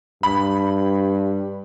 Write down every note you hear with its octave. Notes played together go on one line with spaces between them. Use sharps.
G2 B5